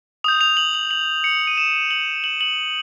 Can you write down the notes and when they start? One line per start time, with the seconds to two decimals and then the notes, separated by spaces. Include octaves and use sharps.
0.24 D#6 G6 F7
0.41 F7
0.57 F#7
0.74 F#7
0.91 F#7
1.24 C#7
1.47 D#7
1.58 E7
1.91 F#7
2.24 F#7
2.41 F#7